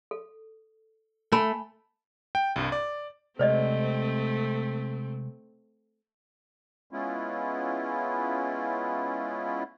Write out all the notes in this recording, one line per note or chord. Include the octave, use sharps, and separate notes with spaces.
A4
A3 G#5 A5 B5
G5
C2 G2
D5
C3 G#3 A3 C4 G4 C5 D5 D#5
G#3 B3 C#4 E4 F4